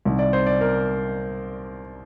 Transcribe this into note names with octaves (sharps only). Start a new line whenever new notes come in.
C2 C3 D#3
D5
C5
D5
A#4